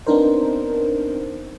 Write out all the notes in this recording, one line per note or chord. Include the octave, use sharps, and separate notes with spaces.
B3 C4 D4 D#4 A#4 C5